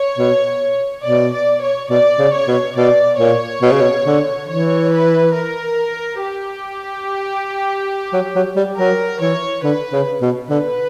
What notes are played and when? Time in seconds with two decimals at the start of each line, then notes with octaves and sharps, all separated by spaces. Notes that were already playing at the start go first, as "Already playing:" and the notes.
Already playing: C#5
0.18 B2
1.04 B2 D5
1.33 D5
1.62 C#5
1.90 B2 D5
2.19 C#3
2.33 C#5
2.48 B2
2.76 B2 D5
3.19 A#2 C#5
3.62 B2
3.72 C#3
3.81 B2
4.05 D3
4.48 E3 C#5
4.91 B4
5.34 A#4
6.20 G4
8.13 F#3
8.35 F#3
8.56 G3
8.78 F#3 A#4
9.20 E3 C#5
9.64 D3 B4
9.93 C#3
10.21 B2
10.50 D3 B4